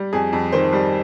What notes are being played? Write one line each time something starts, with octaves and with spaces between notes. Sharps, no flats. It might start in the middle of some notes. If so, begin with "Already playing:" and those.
Already playing: G3
F2 G#4
F2
D#3 C5
G3